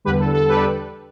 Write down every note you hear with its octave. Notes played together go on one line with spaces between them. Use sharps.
E2 D3 G3 G4 B4
A4
A4
G4 B4
D5